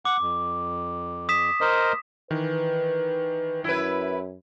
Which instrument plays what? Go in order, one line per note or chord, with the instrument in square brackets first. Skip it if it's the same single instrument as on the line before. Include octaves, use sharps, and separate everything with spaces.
[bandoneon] F#5 [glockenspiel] D6
[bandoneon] F2
[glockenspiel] D#6 B6 E7
[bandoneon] A#4 C5 D#5
[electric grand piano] D#3 E3 [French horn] B4
[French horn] F#2 [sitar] E4 B4